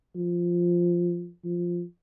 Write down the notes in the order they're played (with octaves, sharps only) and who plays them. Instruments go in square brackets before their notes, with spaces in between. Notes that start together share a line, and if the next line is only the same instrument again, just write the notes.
[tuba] F3
F3